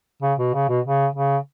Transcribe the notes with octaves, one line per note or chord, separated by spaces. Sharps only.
C#3
B2
C#3
B2
C#3
C#3